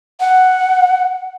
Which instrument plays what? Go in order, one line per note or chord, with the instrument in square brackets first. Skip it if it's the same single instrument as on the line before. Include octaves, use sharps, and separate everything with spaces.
[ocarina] F#5